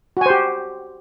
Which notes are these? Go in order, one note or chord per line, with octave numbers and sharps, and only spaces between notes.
F#4 G4 C5 G#5